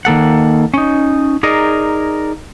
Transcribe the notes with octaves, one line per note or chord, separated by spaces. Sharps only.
D#3 A#3 A4 F#5
C#4 D#4
D#4 G#4 A#4 D5 D#5